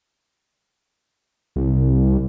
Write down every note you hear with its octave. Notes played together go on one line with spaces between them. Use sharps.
C2